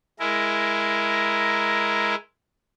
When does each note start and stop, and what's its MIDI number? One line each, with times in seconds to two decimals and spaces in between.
0.20 2.15 56
0.20 2.15 64
0.20 2.15 70